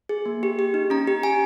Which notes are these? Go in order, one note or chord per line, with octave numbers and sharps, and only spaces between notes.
G#4
A#3
G4
G4
D#4
C#4 A#5
G4
G4 G#5